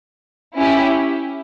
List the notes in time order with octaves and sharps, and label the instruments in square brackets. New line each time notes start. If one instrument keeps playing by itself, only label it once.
[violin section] C#4 E4 G4